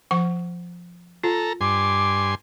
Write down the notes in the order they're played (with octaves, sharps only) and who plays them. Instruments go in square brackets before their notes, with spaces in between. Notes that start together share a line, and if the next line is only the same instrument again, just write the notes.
[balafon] F3 F#5 C#6
[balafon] F4 [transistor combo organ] A4 A#5
[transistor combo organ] G2 G#5 C6 [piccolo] D6